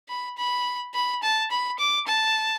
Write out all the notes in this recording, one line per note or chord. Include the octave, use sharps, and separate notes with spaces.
B5
B5
B5
A5
B5
D6
A5